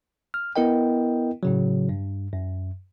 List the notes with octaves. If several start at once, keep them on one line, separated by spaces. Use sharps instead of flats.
F6
B3 E4 A#4 D#5 G5
A2 C#3 F#3
G2
F#2